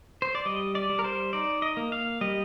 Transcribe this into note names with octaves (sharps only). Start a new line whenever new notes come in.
C5
D5
G3 D#5
D5
G3
A#4
C5
D#4 D5
D#5
A#3
F5
G3 D#5